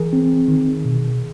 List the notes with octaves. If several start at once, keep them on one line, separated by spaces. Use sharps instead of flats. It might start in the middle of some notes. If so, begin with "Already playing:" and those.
Already playing: E3 G#4 A#4
C4
D#3
B2